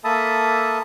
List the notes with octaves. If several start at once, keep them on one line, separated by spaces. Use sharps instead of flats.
A#3 A4 E5 A5 B5 D#6